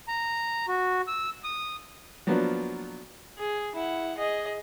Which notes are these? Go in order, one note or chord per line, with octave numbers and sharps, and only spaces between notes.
A#5
F#4
E6
D#6
F3 F#3 A#3 B3 D4 F#4
G#4
E4 F#5
G#4 D#5